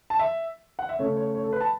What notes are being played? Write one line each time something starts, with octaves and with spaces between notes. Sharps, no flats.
A5
E5
F#5
E5
C#3 A3 C#4 C#5
C#5
C#5
A4
B4
B5
A5